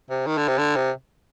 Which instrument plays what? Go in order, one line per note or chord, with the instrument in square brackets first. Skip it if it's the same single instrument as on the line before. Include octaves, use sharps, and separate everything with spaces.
[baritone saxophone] C3
D#3
D3
C3
D3
C3